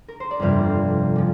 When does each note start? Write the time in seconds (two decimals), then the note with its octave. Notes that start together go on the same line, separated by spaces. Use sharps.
0.08 A#4
0.20 C5
0.31 D5
0.39 G1 F2 C3 G3 A#3 F5
1.16 A#2 F3